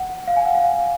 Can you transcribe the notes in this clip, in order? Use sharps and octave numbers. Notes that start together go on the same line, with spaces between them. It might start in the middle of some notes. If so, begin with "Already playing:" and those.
Already playing: F#5
F5
G#5
F#5
F5